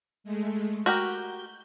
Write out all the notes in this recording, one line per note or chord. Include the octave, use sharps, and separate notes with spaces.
G#3 A3
F#4 G4 A#4 G6